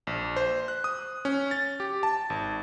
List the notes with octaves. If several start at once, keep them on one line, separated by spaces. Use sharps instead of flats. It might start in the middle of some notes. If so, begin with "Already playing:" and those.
A#1
C5
F#6
D#6
C#4
A6
G4
A5
G#1